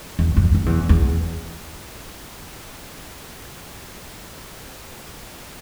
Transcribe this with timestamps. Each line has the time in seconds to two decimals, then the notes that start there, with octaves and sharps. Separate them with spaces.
0.19 E2
0.36 F2
0.55 F2
0.66 E2
0.89 E2